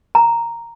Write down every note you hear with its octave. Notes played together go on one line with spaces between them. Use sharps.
A#5